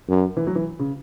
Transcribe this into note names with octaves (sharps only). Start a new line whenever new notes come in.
F#2
E3
F#3
E3
C#3